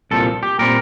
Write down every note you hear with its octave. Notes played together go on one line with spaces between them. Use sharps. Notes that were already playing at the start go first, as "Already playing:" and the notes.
C2 A#2 F3 A4
G4
A#2 G3 C4 A#4